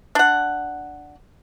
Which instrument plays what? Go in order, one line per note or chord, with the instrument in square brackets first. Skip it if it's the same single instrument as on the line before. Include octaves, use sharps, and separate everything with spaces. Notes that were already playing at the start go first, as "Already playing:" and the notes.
[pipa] D4 F#5